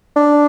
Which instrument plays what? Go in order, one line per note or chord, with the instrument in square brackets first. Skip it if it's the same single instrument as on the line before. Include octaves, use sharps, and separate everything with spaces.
[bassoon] D4